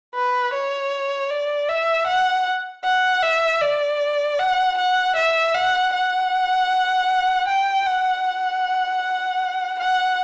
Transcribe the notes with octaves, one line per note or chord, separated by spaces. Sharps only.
B4
C#5
D5
E5
F#5
F#5
E5
D5
F#5
F#5
E5
F#5
F#5
G5
F#5
F#5